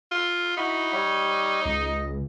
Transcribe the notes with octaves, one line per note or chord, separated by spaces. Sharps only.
F4
D#4 E4 F#4 B5
G3 C#5
C#2 D#5